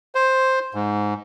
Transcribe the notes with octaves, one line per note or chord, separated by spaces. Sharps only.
C5
G#2